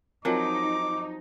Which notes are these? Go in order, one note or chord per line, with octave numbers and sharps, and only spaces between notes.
F3 F#3 C4 D#4 A#4 D6